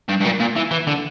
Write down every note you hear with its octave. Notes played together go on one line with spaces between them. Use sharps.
G2
G2
A#2
A#2
E3
E3
D3